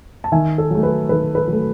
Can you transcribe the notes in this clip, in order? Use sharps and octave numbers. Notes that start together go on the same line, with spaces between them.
A5
D#3 E5 G#5
A4
F#3 A3
B4
D#3 B4
B4
F#3 A3